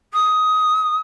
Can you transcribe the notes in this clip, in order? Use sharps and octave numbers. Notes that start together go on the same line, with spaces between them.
D#6